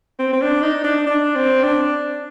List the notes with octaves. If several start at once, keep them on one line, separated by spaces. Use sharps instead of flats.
C4
C4
D4
D#4
D4
D4
C4
D4